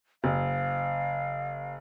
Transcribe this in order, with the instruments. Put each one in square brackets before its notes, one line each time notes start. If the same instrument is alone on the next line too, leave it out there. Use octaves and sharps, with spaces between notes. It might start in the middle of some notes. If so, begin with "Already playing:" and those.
[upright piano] F#1 [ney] F5